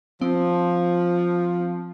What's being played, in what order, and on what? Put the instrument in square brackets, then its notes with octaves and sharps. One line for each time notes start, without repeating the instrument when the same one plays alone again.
[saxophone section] F3 [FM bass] C4